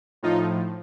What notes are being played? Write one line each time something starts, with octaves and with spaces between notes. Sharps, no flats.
A2 F3 D#4 F4